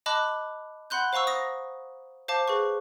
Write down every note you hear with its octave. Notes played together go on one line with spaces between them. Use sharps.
D#5 A5 B5 D6 F#6
F#5 B5 C6 F#6 G6
C5 F5 A#5 C#6 E6
D#6 A#6
C5 F5 A5 D6
G#4 B4 C#6